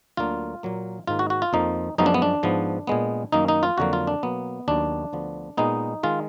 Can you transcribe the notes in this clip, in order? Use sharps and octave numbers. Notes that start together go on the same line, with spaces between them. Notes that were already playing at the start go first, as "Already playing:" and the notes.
D2 D3 F#3 A#3 F4
A#2 F#3 A#3
G#2 D#3 A#3 F4
F#4
F#4
F4
F2 F3 A#3 D#4
F#2 F3 G#3 B3 D#4
D4
B3
D4
G#2 F3 B3
A#2 G#3 B3
F#2 D#3 A#3 D#4
D#4
F4
F2 D3 F#3 A#3 F#4
F4
D4
B2 F#3 A#3 B3
D#2 D#3 F#3 B3 D4
D2 D3 F3 B3
A#2 G#3 B3 D#4
D#3 G#3 F4